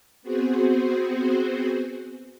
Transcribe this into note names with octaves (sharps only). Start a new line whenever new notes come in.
B3 C4 F#4 G#4 C5